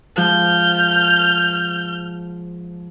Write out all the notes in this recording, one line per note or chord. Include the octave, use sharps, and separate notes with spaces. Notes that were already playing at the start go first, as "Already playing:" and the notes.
G#2 F3 F6 G6